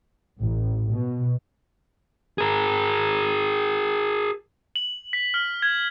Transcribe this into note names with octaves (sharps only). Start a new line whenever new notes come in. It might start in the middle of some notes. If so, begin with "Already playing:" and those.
A1
B2
G#4 A#4
F#7
B6
F6
G#6